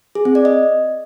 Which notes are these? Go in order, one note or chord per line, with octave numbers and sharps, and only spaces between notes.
G#4
C4
D5
D#5